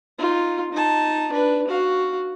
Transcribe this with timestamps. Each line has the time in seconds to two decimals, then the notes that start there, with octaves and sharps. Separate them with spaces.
0.19 D#4 F4
0.72 D#4 A5
1.31 D4 B4
1.68 F#4 F5